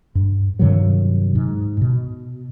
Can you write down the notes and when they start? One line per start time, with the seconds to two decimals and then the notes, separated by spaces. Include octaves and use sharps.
0.15 G2
0.59 G2 C3 D#3 F#3
1.35 G#2
1.81 B2